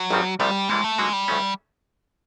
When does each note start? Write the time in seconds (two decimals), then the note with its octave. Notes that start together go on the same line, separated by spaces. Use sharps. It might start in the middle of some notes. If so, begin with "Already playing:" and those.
Already playing: F#3
0.11 G#1 G2 D#3 G3 C4
0.40 C2 C3 F3 G3 A3
0.69 A2 E3 G3 G#3 A#3
0.84 A3
0.98 D3 F#3 G#3 A#3 D#4 F#4
1.13 G3
1.28 D2 C#3 F3 A3 C#4